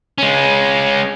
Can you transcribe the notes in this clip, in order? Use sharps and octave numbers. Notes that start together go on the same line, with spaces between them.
G#3 C#4